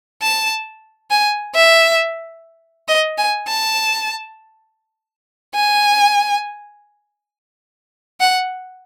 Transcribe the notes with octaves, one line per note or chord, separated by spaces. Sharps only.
A5
G#5
E5
D#5
G#5
A5
G#5
F#5